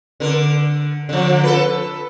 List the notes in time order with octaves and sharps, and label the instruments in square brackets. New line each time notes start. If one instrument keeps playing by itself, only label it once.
[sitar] D3 A#4
D3 F3
A4 B4